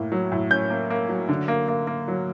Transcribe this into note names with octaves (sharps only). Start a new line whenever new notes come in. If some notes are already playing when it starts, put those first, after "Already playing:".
Already playing: A2 A#3
F#3
A2
C#4 G6
A#3
A#3
F#3
D3
A#3
A#3
A#3
F#3